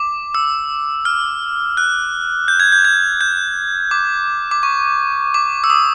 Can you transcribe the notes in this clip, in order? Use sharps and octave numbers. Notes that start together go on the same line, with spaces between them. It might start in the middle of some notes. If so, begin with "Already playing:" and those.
Already playing: D6
E6
F6
F#6
G6
G#6
G6
G#6
G6
D6
D6
C#6
D6
E6
D#6